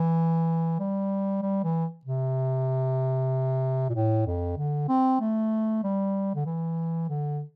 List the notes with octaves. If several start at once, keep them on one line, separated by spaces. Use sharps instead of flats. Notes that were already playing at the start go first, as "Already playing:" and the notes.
Already playing: E3
G3
G3
E3
C3
A#2
A2
F2
D3
C4
A3
G3
D3
E3
D3